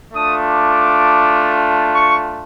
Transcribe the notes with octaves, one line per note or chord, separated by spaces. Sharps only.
A3 D4 F4 D#6
D6
C#6